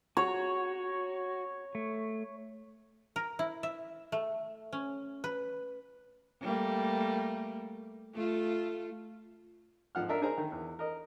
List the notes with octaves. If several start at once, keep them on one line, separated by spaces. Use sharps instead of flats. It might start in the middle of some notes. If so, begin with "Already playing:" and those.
F#4 C#5
A3
A#4
E4
E5
A3
C#4
B4
G3 A3 A#3
A3 F4
G#1 F3 F#5 F6
D4 A#4 E5
D#4 G#4 A#4 C5 A#5
D#3
E2
A#4 D#5